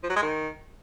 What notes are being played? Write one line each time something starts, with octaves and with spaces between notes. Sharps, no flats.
F3
F#3
G#3
D#3